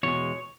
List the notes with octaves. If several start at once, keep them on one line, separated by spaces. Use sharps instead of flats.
E2 B2 G#3 C#5